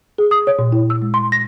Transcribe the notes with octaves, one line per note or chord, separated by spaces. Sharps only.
G#4
D#6
C#5
A#2
E4
E6
G#3
C6
A#6